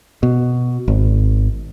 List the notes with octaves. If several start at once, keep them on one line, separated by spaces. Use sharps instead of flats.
B2
G#1